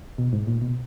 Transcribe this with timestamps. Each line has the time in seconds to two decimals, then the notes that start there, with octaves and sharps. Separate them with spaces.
0.18 B2
0.33 G#2
0.47 A#2
0.61 B2